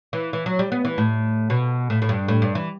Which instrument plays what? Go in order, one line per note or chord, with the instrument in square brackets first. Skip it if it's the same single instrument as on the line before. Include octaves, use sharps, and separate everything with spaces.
[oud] E3
E3
F#3
G3
B3
E3
A2
B2
A2
A2
G2
A2
G2
E3